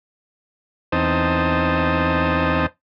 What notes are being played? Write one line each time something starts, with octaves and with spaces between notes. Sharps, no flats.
E2 C4 D#4 C5 A5 D#6